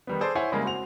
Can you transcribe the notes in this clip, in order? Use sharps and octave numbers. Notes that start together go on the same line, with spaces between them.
D#3 G3 B3
G#4 A4 C5 D5
E4 C5 C#5 F#5 G#5
C#3 G3 G#3 A#3
C4 F#4 F#5 F7